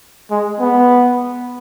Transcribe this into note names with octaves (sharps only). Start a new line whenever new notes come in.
G#3
B3